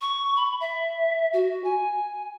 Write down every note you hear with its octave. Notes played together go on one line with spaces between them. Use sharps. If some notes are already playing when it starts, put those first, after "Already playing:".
C#6
B5
E5
F#4
G#5